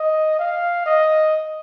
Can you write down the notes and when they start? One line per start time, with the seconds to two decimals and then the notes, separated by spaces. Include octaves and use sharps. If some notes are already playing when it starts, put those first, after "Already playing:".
Already playing: D#5
0.39 F5
0.86 D#5